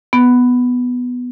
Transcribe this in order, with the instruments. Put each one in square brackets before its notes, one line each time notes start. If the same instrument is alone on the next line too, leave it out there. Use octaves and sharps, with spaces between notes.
[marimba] B3